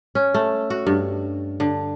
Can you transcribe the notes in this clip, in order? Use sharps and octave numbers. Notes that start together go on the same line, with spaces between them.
C#4
A3
F#4
G2
D3